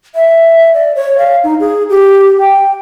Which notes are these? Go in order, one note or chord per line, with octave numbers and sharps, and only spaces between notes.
E5
D5
C#5
F5
D#4
G#4
G4
G5